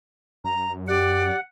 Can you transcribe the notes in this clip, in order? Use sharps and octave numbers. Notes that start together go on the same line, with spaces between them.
F#2 A#5
G4 D5 F#5